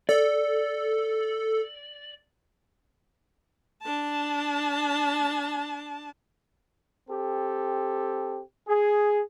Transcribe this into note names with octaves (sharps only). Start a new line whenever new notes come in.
A4 D5
D4 A5
C4 G4 A4
G#4